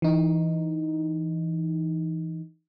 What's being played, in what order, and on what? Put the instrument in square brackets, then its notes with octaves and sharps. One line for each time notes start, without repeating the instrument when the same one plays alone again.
[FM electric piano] E3 D#4